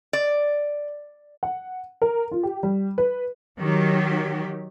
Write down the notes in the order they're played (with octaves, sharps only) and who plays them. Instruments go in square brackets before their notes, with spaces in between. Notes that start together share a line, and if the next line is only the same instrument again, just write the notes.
[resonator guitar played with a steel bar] D5
[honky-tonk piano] F#5
A#4
F4
G4
G3
B4
[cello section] D#3 F#3 G4